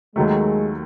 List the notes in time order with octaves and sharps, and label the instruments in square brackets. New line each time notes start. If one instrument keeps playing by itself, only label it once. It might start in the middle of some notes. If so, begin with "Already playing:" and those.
[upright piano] D#2 D#3 F#3 A3 [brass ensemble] G#3